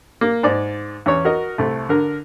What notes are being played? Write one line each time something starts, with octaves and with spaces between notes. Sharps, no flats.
A#3
G#2 D5 D6
E2 C#4 C#5
F#4 A#4 D#5
C2 A3
D3 A#4